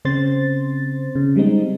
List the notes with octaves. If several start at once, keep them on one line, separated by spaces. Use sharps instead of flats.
C#3 C4 C5 C6 A6
C#3
G3 G#3 C4 D#4